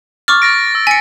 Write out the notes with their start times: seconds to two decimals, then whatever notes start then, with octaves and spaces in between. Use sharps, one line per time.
0.28 C#6 D6 F6 A6
0.42 A6 A#6 D7
0.53 D7
0.75 E6
0.87 G#5 B6 C#7